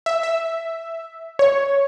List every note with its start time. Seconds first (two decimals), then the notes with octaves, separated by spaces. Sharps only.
0.06 E5
0.23 E5
1.39 C#5